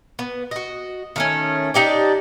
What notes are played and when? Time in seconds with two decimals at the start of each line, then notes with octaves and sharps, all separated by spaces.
0.19 B3
0.51 F#4 D#5
1.16 D#3 A3 C#4
1.74 D4 D#4 G4 D5